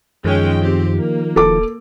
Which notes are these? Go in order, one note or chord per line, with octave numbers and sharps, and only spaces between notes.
F#2 D#3 F3 G#3 C#4 G5
C4 G4
A#3
D#1 A4 D6